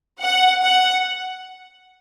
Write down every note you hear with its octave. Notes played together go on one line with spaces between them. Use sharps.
F#5
F#5